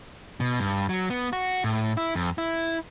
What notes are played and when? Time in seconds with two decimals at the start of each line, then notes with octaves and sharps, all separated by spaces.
0.40 B2
0.60 G2
0.89 F#3
1.10 B3
1.33 F#4
1.64 A2
1.97 E4
2.15 F2
2.38 E4